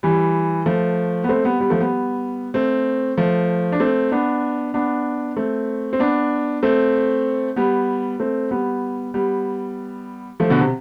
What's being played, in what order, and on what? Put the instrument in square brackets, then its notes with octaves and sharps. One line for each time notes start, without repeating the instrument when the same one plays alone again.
[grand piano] E3 G3
F3 A3
B3
A3 C4
G3 B3
G3 B3
F3 A3
G3 B3
A3 C4
F3 A3
D4
A3 C4
B3 D4
B3 D4
A3 C4
C4
B3 D4
A3 C4
G3 B3
A3 C4
G3 B3
G3 B3
F3 A3
B2 D3
C3